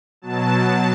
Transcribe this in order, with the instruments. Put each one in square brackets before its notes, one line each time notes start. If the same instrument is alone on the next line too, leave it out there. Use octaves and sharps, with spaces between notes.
[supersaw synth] B2 F#3 A5